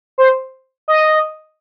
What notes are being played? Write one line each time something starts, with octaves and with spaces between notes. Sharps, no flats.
C5
D#5